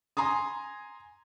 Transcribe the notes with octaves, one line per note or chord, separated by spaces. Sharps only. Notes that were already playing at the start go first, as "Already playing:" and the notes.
G#5 A#5 C6 D#6